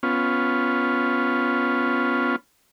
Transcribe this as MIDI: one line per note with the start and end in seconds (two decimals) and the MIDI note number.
0.03 2.36 59
0.03 2.36 61
0.03 2.36 65